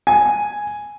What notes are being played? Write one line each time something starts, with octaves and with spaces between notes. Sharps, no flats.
G#5